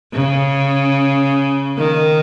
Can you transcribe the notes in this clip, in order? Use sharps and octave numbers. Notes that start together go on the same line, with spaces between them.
C#3
D#3